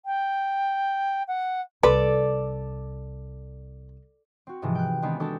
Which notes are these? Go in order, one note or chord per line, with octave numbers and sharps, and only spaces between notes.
G5
F#5
C2 A4 B4 D5
C4 F#4
G#2 C3 E3 F3 G#3
G5 F#6
D#3 G#3 B3 C4 D4
G#3 C4 D4 F#4 G4 A4